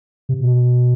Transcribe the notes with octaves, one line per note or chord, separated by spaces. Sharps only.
C3
B2